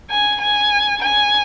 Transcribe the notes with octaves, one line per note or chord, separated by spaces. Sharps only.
G#5
G#5
G#5